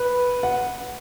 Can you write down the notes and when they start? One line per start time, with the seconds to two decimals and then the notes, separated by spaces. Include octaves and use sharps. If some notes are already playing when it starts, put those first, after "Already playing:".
Already playing: B4
0.43 F#5